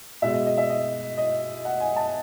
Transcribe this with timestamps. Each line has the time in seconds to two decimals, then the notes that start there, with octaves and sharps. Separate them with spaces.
0.22 B2 G#3 E5
0.34 D#5
0.46 D#5
0.58 E5
0.70 D#5
1.18 D#5
1.65 F#5
1.80 G#5
1.96 A5